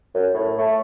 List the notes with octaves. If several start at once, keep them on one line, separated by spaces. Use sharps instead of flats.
F#2
A2
A3